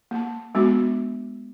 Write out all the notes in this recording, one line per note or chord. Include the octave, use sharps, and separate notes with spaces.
A#3 A5
G#3 B3 D4 F#4